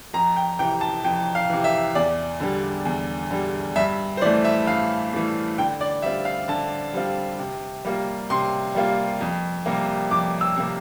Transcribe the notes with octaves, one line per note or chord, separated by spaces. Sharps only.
F2 A#5
G5
C3 E3 G5
A5
F2 G5
F5
C3 E3
E5
E2 D5
D3 G3
E2
D3 G3
G2 E5
C5
E3 A3 D5
E5
G2 F5
E3 A3
D3 G5
D5
G3 C4 F4 E5
F5
D3 A5
G3 C4 F4
C3
G3 A#3 F4
C3 C6
G3 A#3 F4
F2
C3 G3 A#3
F2 D6
E6
C3 G3 A#3